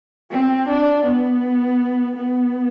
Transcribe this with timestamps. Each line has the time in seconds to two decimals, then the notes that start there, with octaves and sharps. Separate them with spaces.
0.31 C4
0.69 D4
1.05 B3
2.17 B3